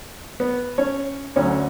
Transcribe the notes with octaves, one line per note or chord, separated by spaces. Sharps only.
B3 B4
C#4 C#5
D2 D3 F#3 C#4 C#5